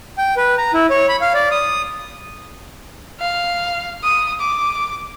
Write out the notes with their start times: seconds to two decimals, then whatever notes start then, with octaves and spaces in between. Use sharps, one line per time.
0.18 G5
0.37 B4
0.58 A#5
0.74 E4
0.90 C#5
1.09 B5
1.21 F5
1.35 D5
1.51 D#6
3.20 F5
4.04 D#6
4.40 D6